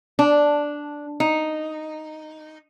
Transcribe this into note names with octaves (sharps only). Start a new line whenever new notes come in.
D4
D#4